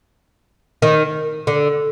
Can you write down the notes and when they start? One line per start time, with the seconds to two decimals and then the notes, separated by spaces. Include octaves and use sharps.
0.82 D#3
1.47 D3